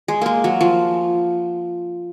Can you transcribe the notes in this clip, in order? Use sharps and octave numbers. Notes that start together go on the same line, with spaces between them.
G#3
G#3 A#3
F#3
F3